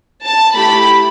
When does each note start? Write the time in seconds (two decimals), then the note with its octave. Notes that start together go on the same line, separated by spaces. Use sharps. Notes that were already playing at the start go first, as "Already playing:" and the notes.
0.24 A5
0.56 A3 E4 G4 B5